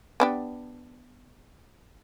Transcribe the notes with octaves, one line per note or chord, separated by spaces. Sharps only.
B3 D4 G4